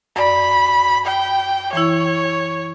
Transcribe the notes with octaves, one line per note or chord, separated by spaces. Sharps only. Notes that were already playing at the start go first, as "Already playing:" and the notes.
F#2 D5 B5
G5
E3 E4 C#5